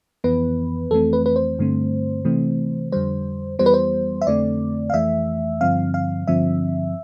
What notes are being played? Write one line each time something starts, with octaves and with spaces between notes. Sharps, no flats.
F2 E3 B3 B4
F2 E3 A3 C4 A4
B4
B4
C5
G2 D3 A3 C4
C3 E3 A3 C4
F2 D3 G3 C5
F2 E3 G3 B3 C5
B4
C5
E5
F2 D3 A3 C4 D5
F5
F2 E3 A3 E5
G2 D3 F3 C4 F5
F5
G2 D3 F3 C4 E5